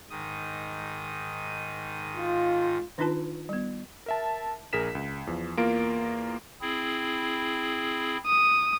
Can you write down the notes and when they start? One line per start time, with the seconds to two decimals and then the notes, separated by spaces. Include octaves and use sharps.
0.10 G#2 D#3 D#6
2.16 F4
2.98 D#3 D4 D#4 F4 B4 A5
3.49 G3 B3
4.06 A#4 E5 A5
4.73 A#1 G#4 A#4 B6 E7
4.95 C#2
5.27 E2 F3
5.57 E2 A#3 F4 A#4 A#5 D7
6.61 C4 E4 G#4
8.26 D#6